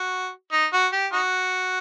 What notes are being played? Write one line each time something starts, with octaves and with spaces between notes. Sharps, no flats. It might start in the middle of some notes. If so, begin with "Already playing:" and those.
Already playing: F#4
D#4
F#4
G4
D#4 F#4